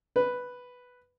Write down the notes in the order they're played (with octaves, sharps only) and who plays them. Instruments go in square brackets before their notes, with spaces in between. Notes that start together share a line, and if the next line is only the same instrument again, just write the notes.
[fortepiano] B4